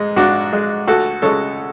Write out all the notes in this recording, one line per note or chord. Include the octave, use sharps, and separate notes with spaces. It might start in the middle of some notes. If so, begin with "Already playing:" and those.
Already playing: G#2 G#3
G#2 D4 F#4
G#3
D2 F#4 A4
C#3 G#3 A4 C#5